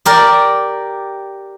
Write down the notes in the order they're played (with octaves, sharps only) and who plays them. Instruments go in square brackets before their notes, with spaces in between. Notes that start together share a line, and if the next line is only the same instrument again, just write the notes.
[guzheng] G4 A#4 D5